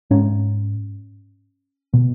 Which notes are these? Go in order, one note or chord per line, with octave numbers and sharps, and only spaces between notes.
G#2 C#4
B2